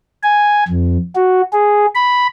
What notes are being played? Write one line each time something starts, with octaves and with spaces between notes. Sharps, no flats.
G#5
F2
F#4
G#4
B5